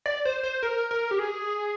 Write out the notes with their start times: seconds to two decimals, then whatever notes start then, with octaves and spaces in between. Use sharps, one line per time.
0.06 D5
0.25 C5
0.43 C5
0.63 A#4
0.91 A#4
1.11 G4
1.19 G#4